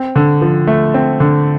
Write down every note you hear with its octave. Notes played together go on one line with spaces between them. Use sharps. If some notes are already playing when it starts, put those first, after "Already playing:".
Already playing: C4
D3
F3
A3
C4
D3